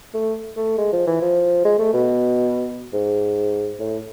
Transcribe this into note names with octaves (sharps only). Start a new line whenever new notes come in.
A3
A3
G#3
F3
E3
F3
G#3
A3
B2
G#2
A2